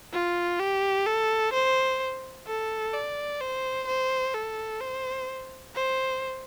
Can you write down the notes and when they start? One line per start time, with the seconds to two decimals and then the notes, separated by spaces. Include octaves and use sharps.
0.13 F4
0.60 G4
1.06 A4
1.53 C5
2.47 A4
2.93 D5
3.41 C5
3.88 C5
4.35 A4
4.81 C5
5.75 C5